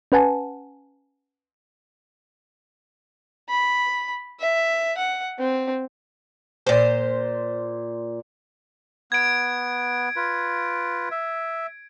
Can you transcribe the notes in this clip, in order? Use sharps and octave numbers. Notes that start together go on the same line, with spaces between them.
C#4 B4 F#5 G#5 A5
B5
E5
F#5
C4
A#2 C5
B3 G#6 D7
F4 B4
E5